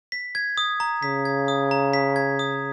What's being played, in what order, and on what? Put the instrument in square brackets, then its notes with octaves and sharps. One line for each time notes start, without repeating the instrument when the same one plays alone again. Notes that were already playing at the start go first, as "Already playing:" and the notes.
[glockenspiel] B6
G#6
D#6
A#5
[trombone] C#3 [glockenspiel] B6
[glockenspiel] G#6
D#6
A#5
B6
G#6
D#6